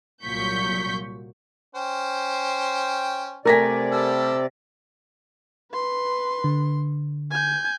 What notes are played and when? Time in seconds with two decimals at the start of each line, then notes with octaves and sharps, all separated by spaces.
0.24 C2 A#2 F#3 C#6 G6 B6
1.75 C#4 C5 G5
3.45 C3 A3 A#4 D5 G#5 A#6 B6
3.91 G3 A4 E6
5.72 B4 C6
6.44 D3
7.31 G#5 G6